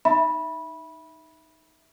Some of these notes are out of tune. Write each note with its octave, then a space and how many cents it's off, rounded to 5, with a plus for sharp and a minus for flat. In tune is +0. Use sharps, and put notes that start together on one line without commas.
D#4 +0 E5 -5 B5 -15